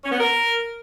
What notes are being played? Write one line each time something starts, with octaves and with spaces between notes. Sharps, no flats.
C#4
B3
A#4